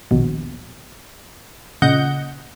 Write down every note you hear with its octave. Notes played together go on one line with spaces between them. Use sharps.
A#1 D#2 B2
A#2 C#3 D#5 F#5 G6